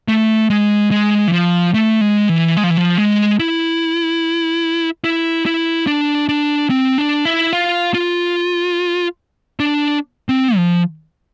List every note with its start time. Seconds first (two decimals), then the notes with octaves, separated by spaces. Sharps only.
0.08 A3
0.50 G#3
0.91 G#3
1.28 E3
1.32 F3
1.74 A3
2.01 G#3
2.29 E3
2.57 G#3
2.64 F3
2.70 E3
2.77 F3
2.98 G#3
3.39 E4
5.04 E4
5.46 E4
5.87 D4
6.29 D4
6.70 C4
6.98 D4
7.25 E4
7.53 F4
7.94 F4
9.60 D4
10.29 C4
10.56 F3